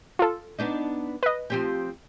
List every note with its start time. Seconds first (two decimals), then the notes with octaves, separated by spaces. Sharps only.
0.19 F4 A4
0.59 B3 D4 D#4
1.23 B4 D#5
1.50 F3 C4 G4